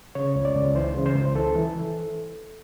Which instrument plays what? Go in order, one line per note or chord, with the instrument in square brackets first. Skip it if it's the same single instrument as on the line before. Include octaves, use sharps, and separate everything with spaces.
[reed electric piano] C#3 C#5
C#2
D5
C#2
E3 C5
C#3
C5
C#2
E3 A4
E3